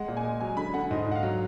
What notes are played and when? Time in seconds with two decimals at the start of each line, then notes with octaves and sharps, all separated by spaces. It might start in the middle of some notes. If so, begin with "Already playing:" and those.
Already playing: G#3 F#5
0.08 A#2
0.17 G#5
0.24 G#3
0.40 F#3 G#5
0.57 D3 B5
0.74 D3 F#5
0.91 G#2 D#5
1.06 G#2
1.11 F#5
1.15 F5
1.23 F#3